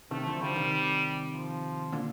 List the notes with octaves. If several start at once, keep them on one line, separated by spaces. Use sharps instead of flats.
C3 D#3 A3
D3 F3
D3 F3 G3
C3 D#3
F3
A#2 D3